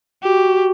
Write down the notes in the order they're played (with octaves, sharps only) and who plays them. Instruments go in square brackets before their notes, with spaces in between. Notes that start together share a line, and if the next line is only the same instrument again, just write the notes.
[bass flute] F#4 [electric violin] G4